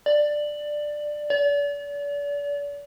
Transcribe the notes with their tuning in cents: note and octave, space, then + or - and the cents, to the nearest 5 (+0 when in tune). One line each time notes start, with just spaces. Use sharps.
D5 +10
D5 -40